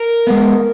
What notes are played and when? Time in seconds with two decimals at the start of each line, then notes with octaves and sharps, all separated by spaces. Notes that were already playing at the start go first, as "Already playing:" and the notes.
Already playing: A#4
0.27 G#3 B3